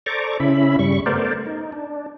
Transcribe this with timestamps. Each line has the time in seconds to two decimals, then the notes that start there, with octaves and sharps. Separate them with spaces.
0.06 A4 C5 D5 A#5 C#6 D6
0.40 C#3 C#4 E4 E5 B5
0.79 G2 C#3 G3 C#6
1.06 A3 B3 A#4 C5 D5
1.46 D#4
1.72 D4